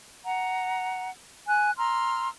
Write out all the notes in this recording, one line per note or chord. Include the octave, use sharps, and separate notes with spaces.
F#5 A#5
G#5 F#6
A#5 C6 E6 F6